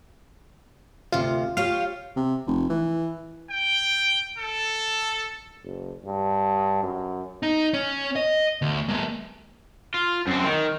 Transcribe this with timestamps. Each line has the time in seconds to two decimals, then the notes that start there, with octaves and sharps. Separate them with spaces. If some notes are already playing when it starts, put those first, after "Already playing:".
1.12 D2 C3 F4
1.57 F4 G4 C#5 F5
2.16 C3
2.47 F1
2.70 E3
3.50 G5
4.37 A4
5.64 F#1
6.05 G2
6.83 F#2
7.43 D#4
7.74 C#4
8.16 D#5
8.62 D2
8.89 G#3 A#3
9.94 F4
10.27 F#2 C4
10.45 D#3